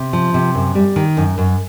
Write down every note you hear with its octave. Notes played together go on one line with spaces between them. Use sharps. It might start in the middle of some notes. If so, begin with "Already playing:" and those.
Already playing: C3
F3
C3
F#2
G3
D#3
F#2
F#2